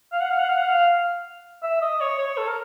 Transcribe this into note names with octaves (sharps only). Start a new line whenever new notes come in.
F5
F#5
F5
F#5
F5
F#5
F5
E5
D#5
C#5
C#5
A4
A#4